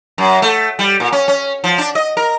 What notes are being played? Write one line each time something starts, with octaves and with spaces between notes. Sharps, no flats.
F#2
A3
G3
A#2
C#4
C#4
F3
D4
D#5
A#4